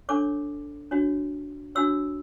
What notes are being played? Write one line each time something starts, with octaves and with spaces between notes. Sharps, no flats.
D4 A4 C#5 D6
D4 F#4 C#5
D4 F#4 C#5 E6